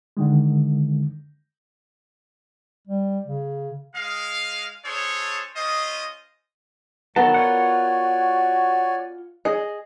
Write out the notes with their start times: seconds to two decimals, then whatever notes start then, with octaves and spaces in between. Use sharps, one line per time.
0.17 D3 D#3 G#3
2.87 G3
3.26 C#3
3.94 G#3 F5
4.85 D4 G#4 A4 C5 C#5
5.55 C#4 F4 C5 D#5
7.16 D#3 F#3 B3 F#4 A4 A#4 A5
7.34 F4 C#5 D5 F#5 G#5
9.45 G#4 D#5